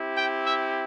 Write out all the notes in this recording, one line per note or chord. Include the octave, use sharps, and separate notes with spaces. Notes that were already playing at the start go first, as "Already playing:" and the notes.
Already playing: C4 E4 G4
G5
E5